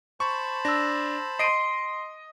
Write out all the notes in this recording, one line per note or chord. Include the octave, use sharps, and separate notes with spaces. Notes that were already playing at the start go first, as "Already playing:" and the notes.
C5 A5 B5 C#6
D4 E6 A#6
D#5 C6 C7 D7 D#7